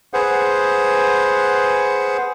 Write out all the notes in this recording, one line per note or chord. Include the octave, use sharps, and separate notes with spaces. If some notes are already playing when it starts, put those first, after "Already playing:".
G#4 B4 C5 F#5